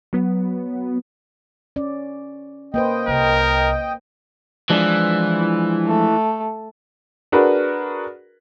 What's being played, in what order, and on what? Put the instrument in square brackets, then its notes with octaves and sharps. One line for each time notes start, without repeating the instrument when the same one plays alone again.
[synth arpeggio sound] F#3 B3
[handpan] C#4 D5
[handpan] A#3 B4 C5 [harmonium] D#5 G5
[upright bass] C2 [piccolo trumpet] A#4
[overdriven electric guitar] E3 [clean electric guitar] F3 G#3 D4
[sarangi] A3
[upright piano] D4 F#4 G#4 A#4 B4